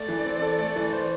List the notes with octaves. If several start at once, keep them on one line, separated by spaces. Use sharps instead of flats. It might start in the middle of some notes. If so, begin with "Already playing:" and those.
Already playing: A3 D5
E3
C4
A4
A3
E3
C5